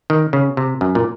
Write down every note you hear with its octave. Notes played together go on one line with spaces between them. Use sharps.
D#3
C#3
C3
F#2
A#2